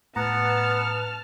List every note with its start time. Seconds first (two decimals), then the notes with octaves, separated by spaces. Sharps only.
0.16 A2 B3 B4 F#5 A5 A#5 F6